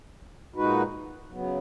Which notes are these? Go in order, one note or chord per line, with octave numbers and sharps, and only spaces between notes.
A#2 G#3 D#4 F#4 B4
C#3 F#3 B3